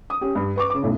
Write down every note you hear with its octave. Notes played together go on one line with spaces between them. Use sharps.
D#6
C#4 G4
G2
B4 C#6 D6
C#3 D6
B1 F#2 A2